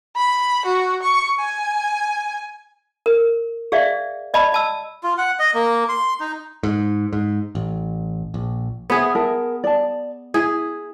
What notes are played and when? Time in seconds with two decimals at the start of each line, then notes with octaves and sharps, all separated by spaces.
0.16 B5
0.65 F#4
1.02 C#6
1.39 G#5
3.06 A#4
3.72 G#4 D5 E5 F5
4.34 D5 D#5 A5 B5
4.52 D#5 A5 E6
5.03 F4
5.18 F#5
5.39 D#5
5.54 A#3
5.89 C6
6.20 D#4
6.63 G#2
7.13 G#2
7.55 A1
8.34 A#1
8.90 B3 G#4 C5 E5
9.15 A#4 E5 A5
9.64 D5 A5
10.34 E4 G#4